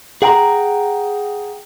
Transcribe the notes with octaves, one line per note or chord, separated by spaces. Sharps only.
G#4 F#5 G5 A5 A#5